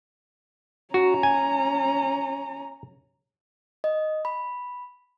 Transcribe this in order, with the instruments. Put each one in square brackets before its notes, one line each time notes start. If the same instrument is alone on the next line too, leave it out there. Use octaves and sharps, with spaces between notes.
[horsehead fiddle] C#4 A#5 [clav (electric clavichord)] F#4
[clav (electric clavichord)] G#5
[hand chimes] D#5
B5